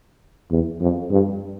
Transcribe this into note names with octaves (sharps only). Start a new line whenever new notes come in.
E2
F2
G2